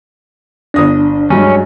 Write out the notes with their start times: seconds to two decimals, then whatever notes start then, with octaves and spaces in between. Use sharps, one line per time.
0.74 G1 D4 D#6 A#6
1.30 G2 F#3 G#3 C#4